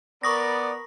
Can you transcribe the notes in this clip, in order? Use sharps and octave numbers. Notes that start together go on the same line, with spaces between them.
B3 A#4 D5 B5 C#6 D#6 A#6